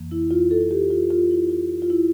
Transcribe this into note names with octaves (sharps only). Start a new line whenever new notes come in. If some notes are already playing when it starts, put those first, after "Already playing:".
Already playing: F2 E3 A#3
E4
F4
A4
F4
G4
F4
F4
E4
F4
F4
E4